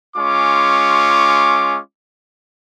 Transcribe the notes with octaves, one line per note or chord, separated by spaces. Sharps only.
G#3 C#4 F4 C#6 D6